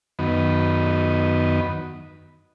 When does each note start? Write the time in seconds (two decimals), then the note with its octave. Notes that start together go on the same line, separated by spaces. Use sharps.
0.19 F#2 D#3 B3